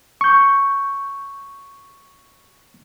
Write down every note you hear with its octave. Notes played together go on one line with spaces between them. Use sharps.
C#6 G6